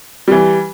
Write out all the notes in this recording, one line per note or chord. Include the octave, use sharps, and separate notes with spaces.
E3 G3